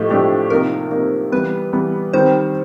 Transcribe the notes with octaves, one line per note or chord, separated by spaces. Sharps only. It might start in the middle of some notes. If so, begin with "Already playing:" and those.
Already playing: A2 F3 A3 G4 D#5
A2 F3 A3 D4 G4
C3 F3 A#3 D#4 A#4
C3 F3 A#3 D#4
E3 G3 B3 B4
E3 G3 B3
D#3 G3 C4 C5